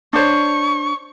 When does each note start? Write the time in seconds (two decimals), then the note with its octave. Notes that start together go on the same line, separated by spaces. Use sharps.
0.13 D4 C5 C#5 C#6